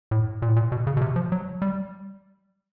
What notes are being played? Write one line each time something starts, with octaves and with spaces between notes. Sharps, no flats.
A2
A#2
A2
A#2
B2
C#3
B2
C3
F3
F#3
G3